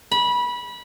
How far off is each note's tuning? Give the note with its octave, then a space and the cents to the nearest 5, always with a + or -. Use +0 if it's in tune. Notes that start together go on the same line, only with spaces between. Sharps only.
B5 -20